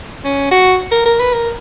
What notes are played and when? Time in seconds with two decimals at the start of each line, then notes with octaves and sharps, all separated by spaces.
0.25 C#4
0.51 F#4
0.91 A#4
1.06 A#4
1.20 B4
1.33 A#4